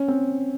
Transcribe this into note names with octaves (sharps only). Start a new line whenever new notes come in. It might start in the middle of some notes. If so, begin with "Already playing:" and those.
Already playing: C#4
C4